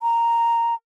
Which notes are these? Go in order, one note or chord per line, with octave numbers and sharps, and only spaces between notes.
A#5